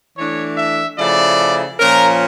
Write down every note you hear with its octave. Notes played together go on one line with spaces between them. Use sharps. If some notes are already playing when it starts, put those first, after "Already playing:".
E3 A3 D4 C#5
E5
C#3 F3 A3 C#4 E4 D5
A#2 F3 C#4 A#4